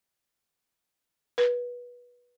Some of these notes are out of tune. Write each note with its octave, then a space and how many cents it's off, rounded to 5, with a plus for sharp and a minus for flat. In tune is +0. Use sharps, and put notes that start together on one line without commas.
B4 -20